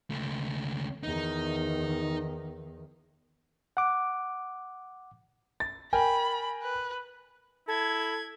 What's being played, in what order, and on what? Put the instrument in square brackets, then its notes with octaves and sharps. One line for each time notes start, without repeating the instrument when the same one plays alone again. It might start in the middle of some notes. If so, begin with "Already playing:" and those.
[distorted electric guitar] C#2 A3
[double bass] E2 D#3 [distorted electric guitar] D#4
[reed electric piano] F#5 D6
[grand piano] A6
[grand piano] A#4 G5 G#5 [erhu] B5
[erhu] B4
[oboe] E4 [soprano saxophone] A4 [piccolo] G#6